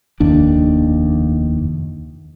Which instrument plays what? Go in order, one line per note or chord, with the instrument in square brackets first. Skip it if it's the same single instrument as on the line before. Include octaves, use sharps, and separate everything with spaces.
[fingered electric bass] F1 D#2 D4